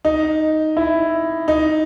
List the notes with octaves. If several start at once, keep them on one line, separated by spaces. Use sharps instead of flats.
D#4
E4
D#4